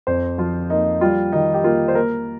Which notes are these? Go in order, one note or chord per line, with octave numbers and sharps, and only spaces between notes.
F2 C5
F3 F4
A#3 D#4
G3 F4
D#3 D#4
G4
A#3 F4
C5
A#3 A#4